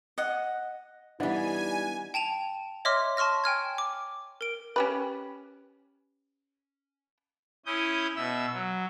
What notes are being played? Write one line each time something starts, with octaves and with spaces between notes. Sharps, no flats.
D#5 F#5
E3 G3 B3 D4 D#4 G#5
G5 A5 D#7 F7
C#5 D#5 E5 C6 D6 F6
A5 C6 C#6 F6 A#6
G5 G#5 F6 G#6
D6
A#4 D7
C#4 G4 B4
C#4 E4 D#6 G6
B2 E5 E6
F#3